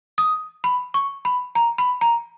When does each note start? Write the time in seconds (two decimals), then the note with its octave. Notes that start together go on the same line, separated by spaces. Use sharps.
0.18 D#6
0.64 B5
0.94 C#6
1.25 B5
1.55 A#5
1.78 B5
2.01 A#5